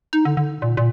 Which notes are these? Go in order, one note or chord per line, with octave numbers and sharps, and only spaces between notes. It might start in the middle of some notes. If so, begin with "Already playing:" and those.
D#4
D3
D3
A#2
A#2